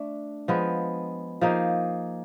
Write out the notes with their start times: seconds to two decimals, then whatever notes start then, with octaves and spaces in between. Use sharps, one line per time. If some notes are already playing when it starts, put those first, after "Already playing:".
Already playing: A3 D4
0.48 F3 G#3 B3
1.41 F3 A#3 D#4 G#4